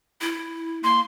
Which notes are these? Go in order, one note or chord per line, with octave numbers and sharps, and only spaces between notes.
E4
A#3 C6